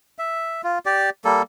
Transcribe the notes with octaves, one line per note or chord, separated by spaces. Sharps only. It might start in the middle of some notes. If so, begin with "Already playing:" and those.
E5
F4
G4 D5
G3 A#3 A4